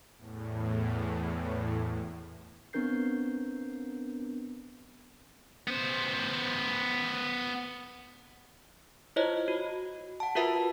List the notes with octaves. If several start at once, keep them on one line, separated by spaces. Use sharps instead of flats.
E2 A2
B3 C4 D4 A#4 G6 C7
B3 C5
E4 F4 C5 C#5 D#5
F#4
F#5 A5
F4 F#4 A#4 B4 E5 A5